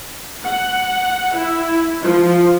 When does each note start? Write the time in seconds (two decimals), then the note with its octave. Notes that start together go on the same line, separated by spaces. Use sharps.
0.44 F#5
1.35 E4
2.01 F3